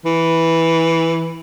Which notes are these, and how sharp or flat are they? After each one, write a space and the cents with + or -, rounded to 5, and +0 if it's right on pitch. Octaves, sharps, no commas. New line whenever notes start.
E3 -5